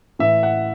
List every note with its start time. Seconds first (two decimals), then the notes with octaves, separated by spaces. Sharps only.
0.19 A2 E3 E5
0.43 F#5